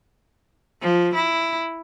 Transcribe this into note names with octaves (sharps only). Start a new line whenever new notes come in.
F3
E4